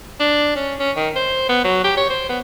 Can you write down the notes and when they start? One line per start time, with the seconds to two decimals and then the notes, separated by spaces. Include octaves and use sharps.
0.20 D4
0.56 C#4
0.79 C#4
0.96 D#3
1.16 C5
1.49 B3
1.64 F#3
1.84 G4
1.97 C#5
2.10 C5
2.29 B3